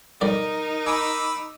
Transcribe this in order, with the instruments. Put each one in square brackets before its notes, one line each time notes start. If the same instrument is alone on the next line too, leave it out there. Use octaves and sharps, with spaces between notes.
[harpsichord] B1 G2 D5 [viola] D#4 [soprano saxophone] A#4
[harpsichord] G#5 [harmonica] B5 D6 E6